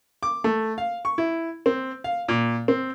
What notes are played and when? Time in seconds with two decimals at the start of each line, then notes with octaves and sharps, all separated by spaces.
0.23 D6
0.44 A3
0.78 F5
1.05 C#6
1.18 E4
1.66 C4
2.04 F5
2.28 A#2
2.68 C4